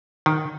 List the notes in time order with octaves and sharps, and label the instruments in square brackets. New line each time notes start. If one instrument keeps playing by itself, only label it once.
[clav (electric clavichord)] D#3